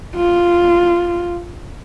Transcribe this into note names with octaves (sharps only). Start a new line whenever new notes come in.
F4